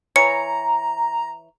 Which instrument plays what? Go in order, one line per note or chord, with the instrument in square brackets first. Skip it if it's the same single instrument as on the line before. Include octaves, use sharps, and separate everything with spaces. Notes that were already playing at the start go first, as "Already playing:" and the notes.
[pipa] E3 C#5 [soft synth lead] A#5 [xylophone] C#7